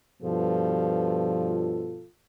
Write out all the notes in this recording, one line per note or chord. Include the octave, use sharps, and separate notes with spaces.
G2 B2 F3 F4 A4